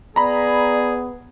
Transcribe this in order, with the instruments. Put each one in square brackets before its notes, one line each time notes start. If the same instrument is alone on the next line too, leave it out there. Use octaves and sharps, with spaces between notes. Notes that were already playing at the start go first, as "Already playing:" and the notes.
[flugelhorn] B3 [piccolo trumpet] G#4 [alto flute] D5 [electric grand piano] A#5 B5